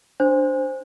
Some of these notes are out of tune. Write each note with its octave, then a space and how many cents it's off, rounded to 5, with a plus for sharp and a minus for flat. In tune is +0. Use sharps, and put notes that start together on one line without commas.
D4 +0 C5 +0